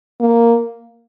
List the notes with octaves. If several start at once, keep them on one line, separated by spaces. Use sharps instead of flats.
A#3